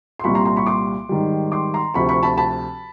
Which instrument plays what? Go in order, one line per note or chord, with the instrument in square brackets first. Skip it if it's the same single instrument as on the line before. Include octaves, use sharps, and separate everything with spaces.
[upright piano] C6
C2 A#2 G3 B5 C#6
A#5 C6
A#5 C6
B5 C#6
C6 D6
G#2 D#3 G3
C6 D6
A#5 C6
D2 C3 F3 B5 C#6
B5 C#6
A5 B5
A5 B5